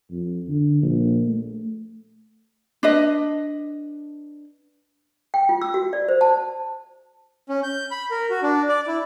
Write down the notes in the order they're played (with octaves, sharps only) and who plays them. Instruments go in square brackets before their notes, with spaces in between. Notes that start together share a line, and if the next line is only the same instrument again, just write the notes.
[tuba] F2
D3
A#1
A3
[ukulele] D4 B4 D#5
[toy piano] G5
F4
E6
F#4
D5
C5
A5
[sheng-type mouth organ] C#4
G6
B5
A#4
F#4
D4
D5
E4